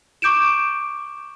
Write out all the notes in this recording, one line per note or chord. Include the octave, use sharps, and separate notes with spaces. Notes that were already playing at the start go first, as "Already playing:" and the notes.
C#6 D6 G6 D7 E7